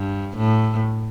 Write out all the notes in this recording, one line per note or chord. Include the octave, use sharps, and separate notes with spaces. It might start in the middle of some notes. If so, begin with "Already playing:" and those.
Already playing: G2
A2